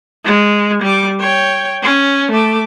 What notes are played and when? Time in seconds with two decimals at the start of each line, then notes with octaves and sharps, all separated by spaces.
0.24 G#3
0.82 G3 D6
1.19 C#5 G5
1.82 C#4
2.31 A3 D6